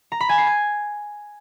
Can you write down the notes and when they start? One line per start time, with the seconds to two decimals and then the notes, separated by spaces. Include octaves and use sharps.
0.12 A#5
0.20 B5
0.29 G#5
0.38 C7
0.47 G#6